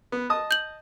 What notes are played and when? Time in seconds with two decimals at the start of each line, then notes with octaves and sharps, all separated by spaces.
0.12 B3
0.30 D#5 A5 D#6
0.51 G6 F#7